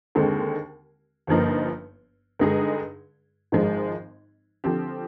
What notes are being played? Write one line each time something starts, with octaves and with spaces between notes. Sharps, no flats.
D#2 D3 G#3 C4
G1 G2 F3 A#3 D#4
G2 D3 G#3 D#4 G#4
G#1 G#2 F3 G#3
D3 F3 C4 G4